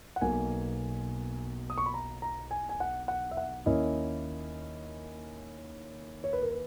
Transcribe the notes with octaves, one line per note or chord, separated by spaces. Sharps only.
F#5
B1 B2 A#3 G#5
D#6
C#6
B5
A#5
A#5
G#5
G#5
F#5
F#5
E5
F#5
D#2 D#3 A#3 C#4 E4 D#5
C#5
B4
A#4
B4